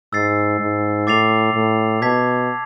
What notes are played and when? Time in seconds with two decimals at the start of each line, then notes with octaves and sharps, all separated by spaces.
0.13 G#2 E6 A6 C7
0.60 G#2
1.07 A2 D6 A6 C7 F7
1.54 A2
2.02 B2 A5 D6 G#6 B6